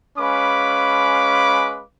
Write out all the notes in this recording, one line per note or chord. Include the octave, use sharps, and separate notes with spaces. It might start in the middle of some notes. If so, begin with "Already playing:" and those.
G#3 C#4 B4 F5 B5 D6